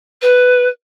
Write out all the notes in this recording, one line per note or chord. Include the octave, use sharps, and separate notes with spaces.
B4